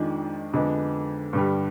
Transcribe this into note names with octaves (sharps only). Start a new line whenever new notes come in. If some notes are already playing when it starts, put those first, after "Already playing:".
Already playing: F2 D#3 G#3 D4
F2 D3 G#3 B3
G2 D3 G3